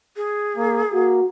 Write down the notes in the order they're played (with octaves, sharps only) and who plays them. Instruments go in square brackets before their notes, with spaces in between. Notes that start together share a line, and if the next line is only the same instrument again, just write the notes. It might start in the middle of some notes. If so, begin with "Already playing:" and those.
[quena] G#4
[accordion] A#3
[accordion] A#3 [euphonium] F#4